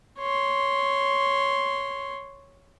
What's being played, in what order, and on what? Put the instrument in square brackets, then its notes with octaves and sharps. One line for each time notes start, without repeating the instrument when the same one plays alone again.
[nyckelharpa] C#5 C6